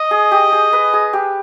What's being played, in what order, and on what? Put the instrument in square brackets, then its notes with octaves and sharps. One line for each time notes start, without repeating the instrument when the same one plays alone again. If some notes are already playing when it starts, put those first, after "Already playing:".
Already playing: [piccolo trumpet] D#5
[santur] G#4
G4
G#4
B4
G#4
G4